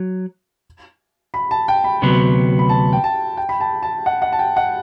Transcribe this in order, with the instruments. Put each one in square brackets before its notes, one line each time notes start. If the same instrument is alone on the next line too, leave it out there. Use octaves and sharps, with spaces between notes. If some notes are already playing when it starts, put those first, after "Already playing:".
Already playing: [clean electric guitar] F#3
[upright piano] B5
A5
G5
B5
[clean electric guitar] D2 C3 F#3 B3
[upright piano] B5
A5
G5
A5
G5
B5
A5
A5
F#5
F#5
A5
G5
F#5